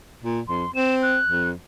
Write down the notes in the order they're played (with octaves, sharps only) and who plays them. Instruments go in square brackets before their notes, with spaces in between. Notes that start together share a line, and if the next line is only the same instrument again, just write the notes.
[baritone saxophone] A#2
[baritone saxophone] F2 [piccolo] C6
[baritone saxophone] C4 [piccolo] E7
[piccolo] F#6
[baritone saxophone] F2